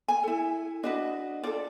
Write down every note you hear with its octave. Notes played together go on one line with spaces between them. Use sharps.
G#5
E4 A4
D4 F#4 B4 D#5
F4 A4 D5